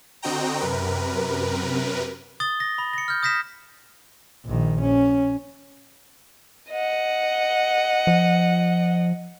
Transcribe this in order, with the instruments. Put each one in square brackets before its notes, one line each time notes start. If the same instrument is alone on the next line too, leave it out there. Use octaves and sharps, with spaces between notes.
[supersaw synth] D3 C4 F#4 D#5 G5 A#5
F#2 C3 A#4 B4
[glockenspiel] D#6 A6 G7
A#6
B5
A#6 C#7
F6 G6
D#6 G6 A#6 B6 E7
[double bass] A#1 D#3
C#4
[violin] D#5 F#5
[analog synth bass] F3